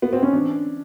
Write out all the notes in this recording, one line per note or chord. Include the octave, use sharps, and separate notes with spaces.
B3
C4
C#4
E3 D4